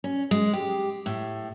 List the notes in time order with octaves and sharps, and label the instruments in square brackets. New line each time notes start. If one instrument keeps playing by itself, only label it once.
[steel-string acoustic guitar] C#4
G#3
G4
A2